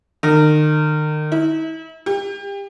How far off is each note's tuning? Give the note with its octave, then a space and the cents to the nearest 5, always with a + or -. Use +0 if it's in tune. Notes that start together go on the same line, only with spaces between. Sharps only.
D#3 -35
E4 -40
G4 +30